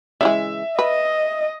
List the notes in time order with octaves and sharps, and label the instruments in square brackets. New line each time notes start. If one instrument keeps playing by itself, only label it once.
[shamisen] C#3 E3 G#3 [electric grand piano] E5
[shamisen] B4 [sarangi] D#5